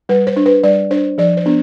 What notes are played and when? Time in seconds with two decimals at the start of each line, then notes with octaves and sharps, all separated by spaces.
0.09 G3 B4
0.27 C5
0.36 D4
0.46 B4
0.63 G3 D5
0.91 D4 C5
1.18 F3 D5
1.37 C5
1.46 B3 D4